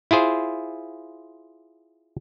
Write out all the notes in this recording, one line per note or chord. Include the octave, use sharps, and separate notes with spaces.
E4 F4 G#4 C5